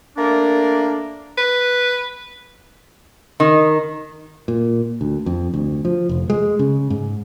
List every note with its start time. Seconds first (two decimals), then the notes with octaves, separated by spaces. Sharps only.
0.17 A3 A#3 D4 A#4 D5
1.38 B4
3.40 D#3
4.48 A#2
5.01 D2
5.26 F2
5.54 D2
5.85 F3
6.09 F1
6.30 G#3
6.59 C#3
6.90 G#2